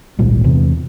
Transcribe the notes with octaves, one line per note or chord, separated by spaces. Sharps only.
G#1 C#2 A#2 G3
E2 C3 E3